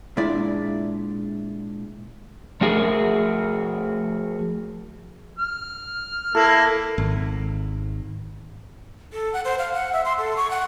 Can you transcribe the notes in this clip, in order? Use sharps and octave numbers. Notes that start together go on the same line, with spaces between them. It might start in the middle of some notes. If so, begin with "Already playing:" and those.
A#2 G#3 D4 E4 D5
F3 A3 F#4 G#4 A#4
F6
A#3 E4 A4
G#1
A4
F#5
C5
F5
F#5
E5
C6
A4
C#6
F#5